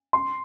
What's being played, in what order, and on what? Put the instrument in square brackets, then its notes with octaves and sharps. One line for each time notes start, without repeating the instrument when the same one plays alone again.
[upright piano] C6